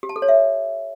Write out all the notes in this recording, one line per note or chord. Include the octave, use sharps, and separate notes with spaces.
G4
A5
A4
C#5
E5